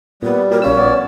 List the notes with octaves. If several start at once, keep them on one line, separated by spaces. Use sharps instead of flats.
A#2 G3 B3
A#2 F#3 G4 A#4
A#1 C#4 F4 E6
B3 D5